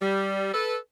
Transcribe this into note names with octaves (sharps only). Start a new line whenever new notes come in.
G3
A4 B4